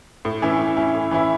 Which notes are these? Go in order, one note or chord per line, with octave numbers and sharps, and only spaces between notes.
A2
E3 C#4 E4
A2
E3 C#4 E4
A2
E3 C#4 E4